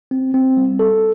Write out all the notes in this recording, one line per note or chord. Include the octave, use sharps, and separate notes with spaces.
C4
C4
G3
A4